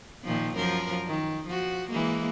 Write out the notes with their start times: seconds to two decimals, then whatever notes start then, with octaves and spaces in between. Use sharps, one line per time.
0.24 A#2 D#3 F3
0.55 F#2 F3 A#4
1.07 D#3
1.48 F3 F#4
1.90 E3 G#3 A#3